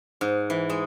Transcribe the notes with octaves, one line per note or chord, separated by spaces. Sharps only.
G#2
E3
G#3